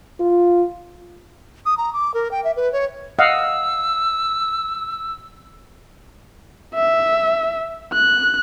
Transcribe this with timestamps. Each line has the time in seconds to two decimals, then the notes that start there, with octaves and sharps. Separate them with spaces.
0.20 F4
1.66 D#6
1.78 A#5
1.93 D6
2.14 A#4
2.31 G5
2.44 E5
2.56 B4
2.73 C#5
3.19 D#5 F5 F#5 E6
6.75 E5
7.93 F#6